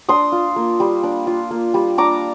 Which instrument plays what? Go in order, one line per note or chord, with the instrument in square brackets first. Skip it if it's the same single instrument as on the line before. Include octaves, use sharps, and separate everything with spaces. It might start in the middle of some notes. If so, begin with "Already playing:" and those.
[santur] D4 C6 D#6
F4
A#3
G3
D4
F4
A#3
G3
D4 A#5 D6